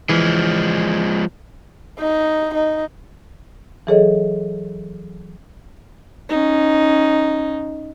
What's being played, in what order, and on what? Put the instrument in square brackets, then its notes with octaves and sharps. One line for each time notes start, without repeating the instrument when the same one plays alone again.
[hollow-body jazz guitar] E3 [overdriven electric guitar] F3 G#3
[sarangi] D#4
D#4
[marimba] E3 F#3 G#4 A4 C#5 D#5
[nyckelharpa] C#4 D#4